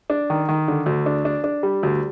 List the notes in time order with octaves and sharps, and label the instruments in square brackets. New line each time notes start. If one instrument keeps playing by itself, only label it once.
[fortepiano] D4
D#3
D#3
D3
D2
D4
D4
D4
G3
D2